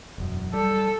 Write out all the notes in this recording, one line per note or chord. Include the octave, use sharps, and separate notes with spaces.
E1 F#2
G3 A4